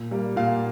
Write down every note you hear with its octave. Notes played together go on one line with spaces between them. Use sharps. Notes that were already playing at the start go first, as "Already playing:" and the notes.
Already playing: A#2
G3 A#3
A#2 F5